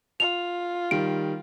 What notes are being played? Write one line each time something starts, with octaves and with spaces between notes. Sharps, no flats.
F4 F7
D#3 G3 D7